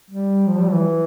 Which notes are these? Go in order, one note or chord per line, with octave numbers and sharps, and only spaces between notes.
G3
F3
G3
E3